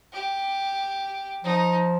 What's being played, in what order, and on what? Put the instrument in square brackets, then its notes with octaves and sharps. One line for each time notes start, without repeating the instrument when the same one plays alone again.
[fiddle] G4
[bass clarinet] F3 [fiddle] D#4